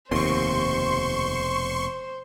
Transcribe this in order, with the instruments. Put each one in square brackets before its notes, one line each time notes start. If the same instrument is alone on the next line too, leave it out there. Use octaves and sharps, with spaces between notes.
[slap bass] F1 B2 C4 [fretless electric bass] D#2 [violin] C5 [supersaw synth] C6 C#6